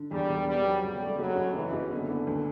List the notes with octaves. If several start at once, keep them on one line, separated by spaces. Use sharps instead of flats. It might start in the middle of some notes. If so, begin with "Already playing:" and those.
Already playing: D3
E2 G3
E1
G3 B3
F#3
C#3 G3
A3
F#1 F#3
F#1
F#1 E3
F#1
D3 B3
B3
D2